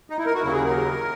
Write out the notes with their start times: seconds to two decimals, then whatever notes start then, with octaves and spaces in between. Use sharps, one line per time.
0.10 D#4
0.18 E4
0.26 A#4
0.35 F#4
0.43 D#2 C#3 F#3 E4
0.53 G#4
0.65 A#4